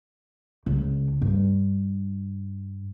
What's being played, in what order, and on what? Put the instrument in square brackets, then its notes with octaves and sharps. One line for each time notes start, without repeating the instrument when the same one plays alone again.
[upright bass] C#2
G2